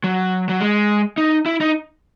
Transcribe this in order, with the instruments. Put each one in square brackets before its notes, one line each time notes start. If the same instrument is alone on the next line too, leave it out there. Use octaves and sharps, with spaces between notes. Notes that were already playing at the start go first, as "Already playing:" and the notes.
[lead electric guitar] F#3
F#3
G#3
D#4
E4
D#4